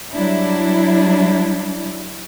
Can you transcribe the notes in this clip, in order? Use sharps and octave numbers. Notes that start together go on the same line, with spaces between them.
F#3 G3 D4 E4